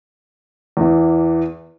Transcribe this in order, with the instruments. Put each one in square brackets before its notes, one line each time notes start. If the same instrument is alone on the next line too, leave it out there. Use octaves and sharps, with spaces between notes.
[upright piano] E2 E3